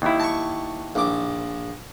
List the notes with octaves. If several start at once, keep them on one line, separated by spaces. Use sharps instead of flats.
D#2 E4
A5 C#6
A#1 D6